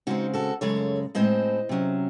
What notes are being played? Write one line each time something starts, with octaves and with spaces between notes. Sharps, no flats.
C#3 G#3 C4 D#4 F#4
F#4 A4
F#2 C#3 G#3 A4 C#5
A2 G#3 C4 C5 D#5
C3 F#3 C#4